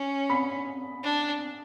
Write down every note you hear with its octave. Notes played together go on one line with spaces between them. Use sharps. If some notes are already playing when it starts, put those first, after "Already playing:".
Already playing: C#4
B5
D4